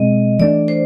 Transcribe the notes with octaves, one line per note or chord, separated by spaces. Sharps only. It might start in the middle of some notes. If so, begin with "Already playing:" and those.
Already playing: B2 G#3 C4 D#5
E3 A3 D4 D5
C5